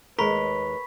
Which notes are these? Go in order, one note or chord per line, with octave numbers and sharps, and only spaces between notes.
D#2 G#3 A#4 B4 B5 C#6 B6